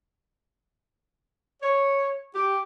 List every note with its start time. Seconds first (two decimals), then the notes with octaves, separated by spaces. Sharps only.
1.62 C#5
2.34 G4